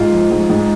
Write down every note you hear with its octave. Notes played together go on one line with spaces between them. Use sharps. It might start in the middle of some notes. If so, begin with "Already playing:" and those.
Already playing: G#2 F4
F3
G#2
G#2